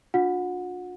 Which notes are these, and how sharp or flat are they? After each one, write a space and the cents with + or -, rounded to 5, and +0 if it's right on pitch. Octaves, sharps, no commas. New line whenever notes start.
D4 +0 F4 +45 F#5 -20